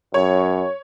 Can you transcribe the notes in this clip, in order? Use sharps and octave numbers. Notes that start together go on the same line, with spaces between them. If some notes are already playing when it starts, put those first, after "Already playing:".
F#2 C#5